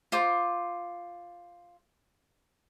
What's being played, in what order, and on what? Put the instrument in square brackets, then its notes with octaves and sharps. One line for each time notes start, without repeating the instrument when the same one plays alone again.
[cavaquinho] F4 C5 D6